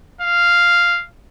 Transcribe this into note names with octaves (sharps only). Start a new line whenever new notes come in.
F5